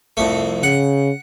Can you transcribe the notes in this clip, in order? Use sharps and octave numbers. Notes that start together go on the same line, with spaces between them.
C2 F2 A3
C#3 F#5